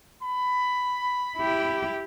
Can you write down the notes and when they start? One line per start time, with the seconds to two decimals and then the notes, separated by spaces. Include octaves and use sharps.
0.22 B5
1.37 E4 G4